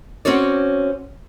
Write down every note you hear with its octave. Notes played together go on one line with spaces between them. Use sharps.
C4 C#4 F#4 C#5 D5